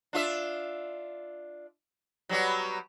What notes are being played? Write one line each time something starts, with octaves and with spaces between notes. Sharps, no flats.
D4 F4 E5
F#3 G3 B3